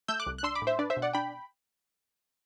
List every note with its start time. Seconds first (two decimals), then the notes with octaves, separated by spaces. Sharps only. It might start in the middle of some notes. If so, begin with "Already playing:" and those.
0.08 A3 E6 G6
0.20 D6 F#6
0.27 C2
0.38 F#6
0.43 D4 C6 E6
0.55 B5 D6
0.62 A2
0.67 C5 E5
0.79 D4 B4 D5
0.90 C5 E5
0.97 B2
1.02 D5 F#5
1.13 D4 G5 B5